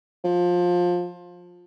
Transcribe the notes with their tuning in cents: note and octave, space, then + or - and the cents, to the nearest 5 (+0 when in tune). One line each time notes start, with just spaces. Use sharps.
F3 +20